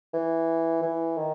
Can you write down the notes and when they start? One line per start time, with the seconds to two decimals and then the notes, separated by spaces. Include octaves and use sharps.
0.14 E3
0.82 E3
1.17 D#3